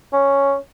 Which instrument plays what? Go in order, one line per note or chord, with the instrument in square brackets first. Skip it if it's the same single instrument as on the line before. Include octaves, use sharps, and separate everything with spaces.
[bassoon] C#4